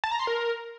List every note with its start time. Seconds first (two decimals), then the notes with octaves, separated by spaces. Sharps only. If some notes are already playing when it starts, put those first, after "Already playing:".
0.04 A5
0.11 A#5
0.19 C6
0.27 A#4